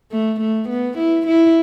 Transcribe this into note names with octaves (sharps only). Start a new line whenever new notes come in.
A3
A3
B3
E4
E4